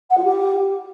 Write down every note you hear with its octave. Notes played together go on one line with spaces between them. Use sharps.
F#5
F4
G4